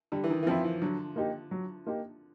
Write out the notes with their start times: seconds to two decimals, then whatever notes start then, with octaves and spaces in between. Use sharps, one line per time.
0.12 D3 G3
0.24 E3
0.30 D#3
0.43 E3
0.46 F3 C4 E4
0.64 E3
0.82 D3 F#3
1.16 A#3 D#4 G4
1.51 F#3
1.87 A#3 D#4 G4